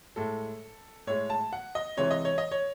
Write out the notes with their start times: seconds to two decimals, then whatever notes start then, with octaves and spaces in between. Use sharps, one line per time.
0.16 A2 G#3 A4
1.07 A2 G#3 C#5
1.30 A5
1.53 F#5
1.75 D#5
1.97 C3 E3 G#3 C#5
2.11 D#5
2.25 C#5
2.38 D#5
2.51 C#5